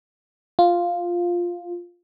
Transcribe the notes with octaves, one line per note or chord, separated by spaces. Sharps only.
F4